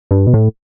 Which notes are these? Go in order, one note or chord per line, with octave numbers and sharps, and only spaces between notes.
G2
B2
A2